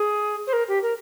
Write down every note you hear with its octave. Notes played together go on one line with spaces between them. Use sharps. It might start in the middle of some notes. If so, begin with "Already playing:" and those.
Already playing: G#4
C5
A#4
G4
A#4